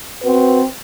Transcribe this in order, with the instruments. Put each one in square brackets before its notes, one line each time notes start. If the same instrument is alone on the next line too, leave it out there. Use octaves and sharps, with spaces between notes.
[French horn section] C4 F#4 B4